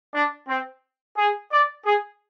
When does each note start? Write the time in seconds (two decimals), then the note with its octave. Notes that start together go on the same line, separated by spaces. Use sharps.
0.13 D4
0.48 C4
1.17 G#4
1.51 D5
1.86 G#4